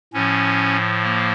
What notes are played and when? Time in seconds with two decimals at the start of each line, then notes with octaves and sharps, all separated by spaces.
0.13 A2 F3 C#4
1.03 A#3